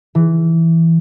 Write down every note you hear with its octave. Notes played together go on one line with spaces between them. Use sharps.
E3